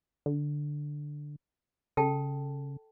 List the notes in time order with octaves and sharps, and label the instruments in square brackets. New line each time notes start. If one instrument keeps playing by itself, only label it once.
[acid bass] D3
[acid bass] C#3 [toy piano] A4 G5 A5